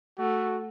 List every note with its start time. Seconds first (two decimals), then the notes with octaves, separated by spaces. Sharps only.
0.19 A3 F#4